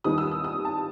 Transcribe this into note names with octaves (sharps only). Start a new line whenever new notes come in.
D#2 D#3 G3 B3 D#4 D#6
E6
D#6
D#6
A5